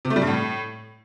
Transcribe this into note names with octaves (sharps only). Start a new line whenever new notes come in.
C3
A3
G3
G2
A2